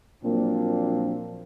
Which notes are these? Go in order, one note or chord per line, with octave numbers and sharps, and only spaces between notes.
A#2 F3 F#3 A#3 C4 D4